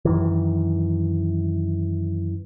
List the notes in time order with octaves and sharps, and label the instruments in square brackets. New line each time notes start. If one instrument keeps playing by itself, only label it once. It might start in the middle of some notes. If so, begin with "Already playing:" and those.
[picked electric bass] F#2 D#3 E3